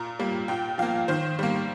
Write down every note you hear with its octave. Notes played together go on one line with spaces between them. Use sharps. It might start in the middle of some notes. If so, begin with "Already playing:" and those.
Already playing: A#2 A#5
G3 A#3
A#2 G5
F3 A#3 F5
D#3 C5
G3 A#3